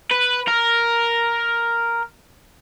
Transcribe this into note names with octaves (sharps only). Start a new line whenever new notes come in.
B4
A#4